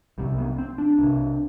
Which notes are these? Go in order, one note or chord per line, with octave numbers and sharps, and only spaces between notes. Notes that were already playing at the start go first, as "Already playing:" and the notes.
C2 C3 G3
B3
C4
D4
C2 C3